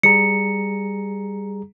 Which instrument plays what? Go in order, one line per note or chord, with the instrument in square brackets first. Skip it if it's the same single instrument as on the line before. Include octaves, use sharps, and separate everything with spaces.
[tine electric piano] G3 G#4 A#5 [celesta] C#7